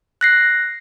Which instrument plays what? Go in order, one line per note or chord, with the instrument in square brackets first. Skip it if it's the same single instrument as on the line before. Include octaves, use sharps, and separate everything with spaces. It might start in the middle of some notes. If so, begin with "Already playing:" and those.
[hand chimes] F#6 A#6 C7